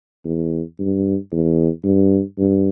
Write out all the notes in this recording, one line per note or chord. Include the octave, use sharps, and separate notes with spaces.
E2
G2
E2
G2
G2